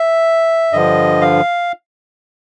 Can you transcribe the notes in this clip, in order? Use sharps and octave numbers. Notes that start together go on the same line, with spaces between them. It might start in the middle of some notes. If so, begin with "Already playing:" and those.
Already playing: E5
G2 D3 F3 D#5
F5